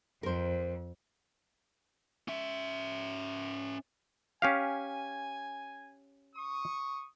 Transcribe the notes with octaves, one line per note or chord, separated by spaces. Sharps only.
F2 A#4 C5
C#4 E5
C#4 G4 F5 G#5
C#6 D#6